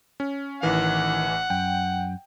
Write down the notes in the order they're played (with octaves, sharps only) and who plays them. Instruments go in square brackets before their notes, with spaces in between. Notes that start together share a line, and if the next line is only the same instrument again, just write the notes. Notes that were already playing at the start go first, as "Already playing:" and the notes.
[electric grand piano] C#4
[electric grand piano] A1 E3 [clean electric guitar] D#3 [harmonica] F#5
[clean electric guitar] F#2 [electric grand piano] G5